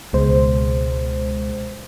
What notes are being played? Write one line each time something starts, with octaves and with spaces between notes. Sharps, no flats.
C#2 B2 G#3 C5